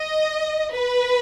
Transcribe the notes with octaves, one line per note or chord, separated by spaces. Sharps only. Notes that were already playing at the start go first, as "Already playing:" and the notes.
Already playing: D#5
B4